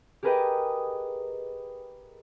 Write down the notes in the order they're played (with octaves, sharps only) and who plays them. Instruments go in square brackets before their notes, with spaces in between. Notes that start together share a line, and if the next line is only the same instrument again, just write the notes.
[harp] G4 G#4 A#4 B4 D#5 G5